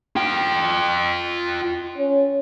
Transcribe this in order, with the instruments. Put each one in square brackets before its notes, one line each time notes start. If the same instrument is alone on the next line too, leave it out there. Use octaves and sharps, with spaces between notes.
[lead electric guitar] F4 G5
[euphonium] C#4